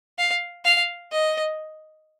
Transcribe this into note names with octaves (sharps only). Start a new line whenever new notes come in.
F5
F5
D#5